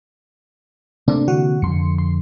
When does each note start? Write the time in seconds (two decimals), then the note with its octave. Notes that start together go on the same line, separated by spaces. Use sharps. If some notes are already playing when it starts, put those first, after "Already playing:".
1.08 C3 A3 A#3 C4 D4
1.28 D3 E3 F#4
1.62 F2 D3 C6 C#7
1.98 C6